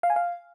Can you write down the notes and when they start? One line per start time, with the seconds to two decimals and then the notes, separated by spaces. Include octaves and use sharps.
0.03 F5
0.10 G#5
0.16 F5